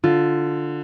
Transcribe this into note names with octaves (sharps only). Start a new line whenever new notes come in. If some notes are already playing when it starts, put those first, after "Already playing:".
D3 F4